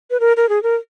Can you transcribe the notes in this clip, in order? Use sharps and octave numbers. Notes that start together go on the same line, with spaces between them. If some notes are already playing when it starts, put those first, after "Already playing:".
B4
A#4
A#4
G#4
A#4